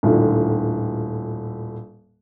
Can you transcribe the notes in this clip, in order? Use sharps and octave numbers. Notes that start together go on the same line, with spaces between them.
D#1 A2 D3